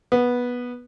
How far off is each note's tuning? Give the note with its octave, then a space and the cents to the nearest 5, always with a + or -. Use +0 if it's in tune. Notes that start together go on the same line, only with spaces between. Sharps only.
B3 -10